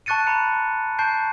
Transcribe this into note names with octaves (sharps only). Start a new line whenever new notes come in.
A5 C#6 F#6 A6 C#7 D#7
A#5 B5 C#7
A5 C#6 G6 C7 D7